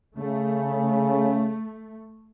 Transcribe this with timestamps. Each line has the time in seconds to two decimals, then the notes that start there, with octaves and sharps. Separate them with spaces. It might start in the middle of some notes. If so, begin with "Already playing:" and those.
0.17 C#3 A3